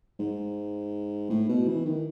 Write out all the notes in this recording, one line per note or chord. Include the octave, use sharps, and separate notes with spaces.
G#2
A2
B2
E3
D#3